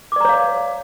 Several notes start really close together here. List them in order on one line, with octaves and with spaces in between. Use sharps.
D6 D5 A#5 C#5 F5